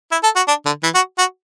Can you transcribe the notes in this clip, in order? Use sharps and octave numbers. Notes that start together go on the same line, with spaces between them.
E4
A4
F#4
D4
D3
E3
F#4
F#4